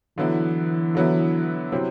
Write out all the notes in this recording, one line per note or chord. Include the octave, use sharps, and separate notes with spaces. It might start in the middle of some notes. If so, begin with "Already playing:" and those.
D3 E3 F#3 B3 E4
D3 F#3 B3 E4
C3 F#3 C4 E4